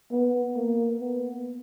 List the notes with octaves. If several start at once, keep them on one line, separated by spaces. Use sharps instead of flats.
B3
A#3
B3